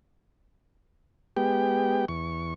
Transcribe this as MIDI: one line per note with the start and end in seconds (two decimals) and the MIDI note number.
1.37 2.05 56
1.37 2.05 59
1.37 2.05 67
1.37 2.05 79
2.08 2.54 40
2.08 2.54 85